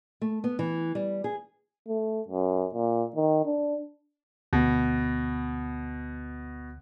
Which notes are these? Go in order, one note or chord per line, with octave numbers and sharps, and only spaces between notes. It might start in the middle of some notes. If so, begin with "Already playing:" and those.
A3
B3
E3
G3
G#4
A3
F#2
A#2
D#3
D4
D2 B2